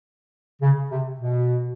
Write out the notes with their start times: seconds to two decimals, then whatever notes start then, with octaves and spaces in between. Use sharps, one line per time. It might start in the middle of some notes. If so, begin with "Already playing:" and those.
0.62 C#3
0.91 C3
1.21 B2